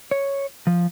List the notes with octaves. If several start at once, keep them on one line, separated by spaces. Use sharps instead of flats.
C#5
F3